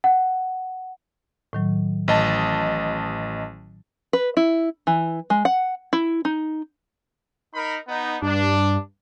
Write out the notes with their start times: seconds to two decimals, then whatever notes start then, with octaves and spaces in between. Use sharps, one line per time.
0.04 F#5
1.53 A2 D#3 F#3
2.08 A1 D#5 A5
4.13 B4
4.37 E4
4.87 E3
5.30 G#3
5.45 F#5
5.93 E4
6.25 D#4
7.53 D#4 A#4 B5
7.88 B3 D#4
8.22 G2 D4